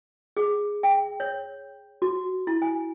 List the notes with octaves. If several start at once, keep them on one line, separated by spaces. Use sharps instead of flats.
G#4
G5
C#5
F#4
E4
G#5